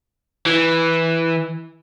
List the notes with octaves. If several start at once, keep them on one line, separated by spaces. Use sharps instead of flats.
E3